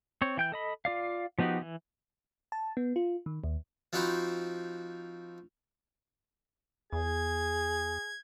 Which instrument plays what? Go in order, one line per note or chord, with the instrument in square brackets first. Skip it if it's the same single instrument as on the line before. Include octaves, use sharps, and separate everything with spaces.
[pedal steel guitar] C4 C#5
E3 G5 G6
A4 D#5 B5
F4 D5 F5
F3 B3 D#4 F#4 G4
E3
[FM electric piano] A5
B3
F4
D#3
D#2
[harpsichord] F3 C4 D#4 F#4 C5 B5
[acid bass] E2 [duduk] G#4 [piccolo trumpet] G#6